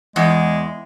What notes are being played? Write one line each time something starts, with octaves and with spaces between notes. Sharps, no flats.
E2 G#3